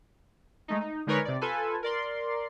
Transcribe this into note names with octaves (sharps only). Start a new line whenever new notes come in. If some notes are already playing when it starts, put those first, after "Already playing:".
G#3 A3 D#4
D#4
D3 G#3 D#4 A#4 B4 C#5
C3 D5
F4 A4 B4 G#5
A#4 D5 C6